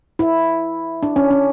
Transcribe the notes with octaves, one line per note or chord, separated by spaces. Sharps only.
E4
D4
C#4
C#4